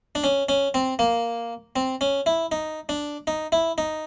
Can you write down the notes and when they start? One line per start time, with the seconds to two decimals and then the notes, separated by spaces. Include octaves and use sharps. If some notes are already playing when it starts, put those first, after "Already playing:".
0.15 D4
0.24 C#4
0.49 C#4
0.74 C4
0.99 A#3
1.76 C4
2.01 C#4
2.26 E4
2.52 D#4
2.89 D4
3.27 D#4
3.52 E4
3.78 D#4